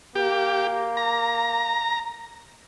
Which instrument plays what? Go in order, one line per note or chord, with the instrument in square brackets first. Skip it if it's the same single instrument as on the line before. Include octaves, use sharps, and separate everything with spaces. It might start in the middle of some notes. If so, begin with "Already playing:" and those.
[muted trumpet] A#3 [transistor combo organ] G4
[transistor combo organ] A#5